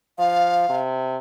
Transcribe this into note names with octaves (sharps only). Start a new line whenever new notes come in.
F3 F5
C3